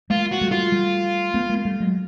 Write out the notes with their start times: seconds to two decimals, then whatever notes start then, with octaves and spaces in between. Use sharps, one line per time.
0.10 G#3 A#3 F4
0.32 F#4
0.41 G3 A3
0.51 F4
0.72 G3 A3
1.34 A3 B3
1.50 G#3 A#3
1.65 G3 A3
1.80 F#3 G#3